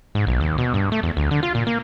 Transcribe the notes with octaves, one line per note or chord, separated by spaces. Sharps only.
G#2
B1
D#2
B2
G2
A3
E2
D2
D3
F4
A#2
A#3